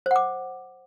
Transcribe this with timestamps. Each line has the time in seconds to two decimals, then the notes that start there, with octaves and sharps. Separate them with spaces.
0.06 C5
0.11 F#5
0.16 D6